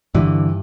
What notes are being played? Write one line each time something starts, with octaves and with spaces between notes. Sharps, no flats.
G2 D3 E3